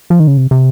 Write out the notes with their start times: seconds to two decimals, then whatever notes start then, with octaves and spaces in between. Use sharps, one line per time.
0.10 F3
0.20 D#3
0.27 C#3
0.37 C3
0.51 C3